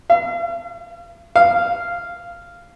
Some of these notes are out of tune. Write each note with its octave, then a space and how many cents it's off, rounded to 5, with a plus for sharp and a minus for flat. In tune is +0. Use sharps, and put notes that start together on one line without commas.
F5 -45
F5 -10